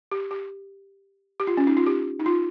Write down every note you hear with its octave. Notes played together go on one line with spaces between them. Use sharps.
G4
G4
G4
F4
C#4
D#4
F4
G4
D#4
F4